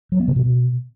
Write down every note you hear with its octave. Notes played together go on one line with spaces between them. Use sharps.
F#3
B3
C3
B2